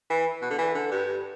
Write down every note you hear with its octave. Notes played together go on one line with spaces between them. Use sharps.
E3
B2
D3
E3
D3
G2